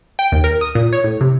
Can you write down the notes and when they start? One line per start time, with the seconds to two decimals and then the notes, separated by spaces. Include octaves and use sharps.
0.19 G5
0.32 D#2
0.44 A#4
0.61 D#6
0.75 A#2
0.93 C#5
1.04 A2
1.21 C3